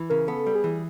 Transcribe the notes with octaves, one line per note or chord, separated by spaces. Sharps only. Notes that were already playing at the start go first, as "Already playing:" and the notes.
Already playing: E3
C#3 A#4
B3 A4
G3
G#4
E3